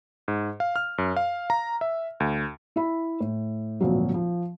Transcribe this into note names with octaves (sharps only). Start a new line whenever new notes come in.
G#2
F5
F6
F#2
F5
A#5
E5
D2
E4 E5 B5
A2
G#1 D2 A#2 F3 F#3
F3